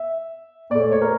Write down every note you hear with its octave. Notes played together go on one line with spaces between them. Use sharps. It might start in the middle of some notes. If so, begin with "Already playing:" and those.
Already playing: E5
A#2 A3 D5
C#5
C#5
A#4